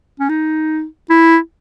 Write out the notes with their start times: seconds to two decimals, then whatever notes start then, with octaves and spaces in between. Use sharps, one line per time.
0.19 C#4
0.29 D#4
1.10 E4